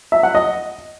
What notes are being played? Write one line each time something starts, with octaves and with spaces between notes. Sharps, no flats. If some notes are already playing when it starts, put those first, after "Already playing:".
E5
F#5
D#5